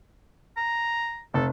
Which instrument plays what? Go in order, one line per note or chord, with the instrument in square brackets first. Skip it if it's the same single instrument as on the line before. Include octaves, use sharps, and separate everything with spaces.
[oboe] A#5
[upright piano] F1 [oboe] A4